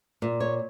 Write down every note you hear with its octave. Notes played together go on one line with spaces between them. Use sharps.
A#2
C#5